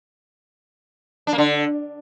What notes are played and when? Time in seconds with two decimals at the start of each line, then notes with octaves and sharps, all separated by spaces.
1.27 D4
1.33 A#3
1.38 D3